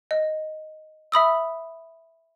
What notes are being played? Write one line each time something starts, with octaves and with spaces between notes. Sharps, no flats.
D#5
E5 B5 D#6 E6